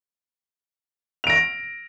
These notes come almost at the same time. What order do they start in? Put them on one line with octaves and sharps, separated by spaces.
F7 D7 A#6